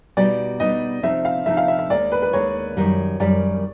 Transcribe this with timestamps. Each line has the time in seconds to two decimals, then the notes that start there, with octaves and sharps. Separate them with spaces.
0.17 B2 G3 B3 D#4 D5
0.60 B2 G3 B3 D#4 D#5
1.03 C3 F3 A3 C4 D#4 E5
1.25 F5
1.46 C3 F3 A3 C4 D#4 E5
1.57 F5
1.68 E5
1.79 E5
1.90 D#2 D#3 G#3 D5
2.12 B4
2.22 B4
2.33 D#2 D#3 G#3 C#5
2.77 F#2 D#3 G3
3.20 F#2 D#3 G3 D5